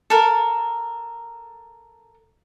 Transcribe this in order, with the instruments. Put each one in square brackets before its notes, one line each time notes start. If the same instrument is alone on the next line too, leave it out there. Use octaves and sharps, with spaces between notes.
[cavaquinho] A4 A#4